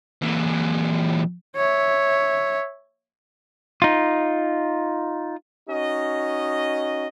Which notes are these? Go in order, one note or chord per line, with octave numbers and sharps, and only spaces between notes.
A#2 E3
C#5 E5
D#4 F4
C#4 D#4 F#4 D#5